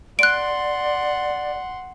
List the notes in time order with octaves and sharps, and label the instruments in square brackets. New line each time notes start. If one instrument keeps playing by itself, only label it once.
[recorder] D5 [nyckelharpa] F#5 C6 [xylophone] F#6 D7